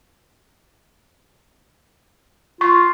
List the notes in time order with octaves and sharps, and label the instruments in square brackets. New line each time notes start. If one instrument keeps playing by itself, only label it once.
[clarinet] F4 [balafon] C#6